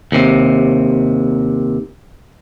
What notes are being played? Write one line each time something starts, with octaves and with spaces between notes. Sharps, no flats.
D#2 C3